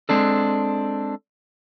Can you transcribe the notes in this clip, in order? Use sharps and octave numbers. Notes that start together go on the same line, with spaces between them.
G#3 C4 D4 A4